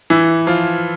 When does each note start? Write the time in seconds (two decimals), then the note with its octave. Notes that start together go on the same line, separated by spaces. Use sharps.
0.10 E3 E4
0.47 F3 F4